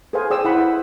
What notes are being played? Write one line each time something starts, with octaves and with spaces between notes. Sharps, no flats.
G#4 A4 B4 C5 F5 G#5
G#4 C5 D5 G5 D#6 E6
E4 F#5 B5